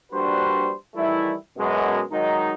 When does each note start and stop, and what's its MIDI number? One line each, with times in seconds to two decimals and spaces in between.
0.12 0.71 34
0.12 0.71 55
0.12 0.71 62
0.12 0.71 66
0.12 0.71 71
0.12 0.71 72
0.95 1.34 51
0.95 1.34 52
0.95 1.34 55
0.95 1.34 57
0.95 1.34 64
1.57 2.01 42
1.57 2.01 47
1.57 2.01 56
2.11 2.53 51
2.11 2.53 54
2.11 2.53 56
2.11 2.53 63